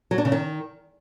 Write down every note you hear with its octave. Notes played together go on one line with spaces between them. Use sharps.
F#3
D4
C#3
D#3